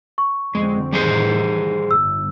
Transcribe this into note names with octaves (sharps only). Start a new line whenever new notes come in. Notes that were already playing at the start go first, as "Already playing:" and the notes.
C#6
F2 D3 G#3 C4
A2 D#3 E3 G3 G#4 C5
G1 E6